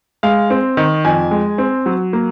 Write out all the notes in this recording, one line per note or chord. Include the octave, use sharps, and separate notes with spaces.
G#3 F5
C4
D#3
F2 G#5
G#3
C4
F#3
A#3